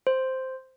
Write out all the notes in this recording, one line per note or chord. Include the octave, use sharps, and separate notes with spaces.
C5